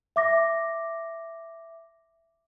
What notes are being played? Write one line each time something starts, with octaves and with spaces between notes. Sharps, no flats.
E5 D6 A#6